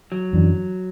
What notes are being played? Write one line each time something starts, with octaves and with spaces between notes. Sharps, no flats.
F#3
F#2 E3 D4